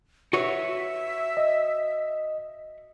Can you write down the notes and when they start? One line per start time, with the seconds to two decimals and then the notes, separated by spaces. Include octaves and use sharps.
0.33 F#4 B4 C#5 E5
1.37 D#5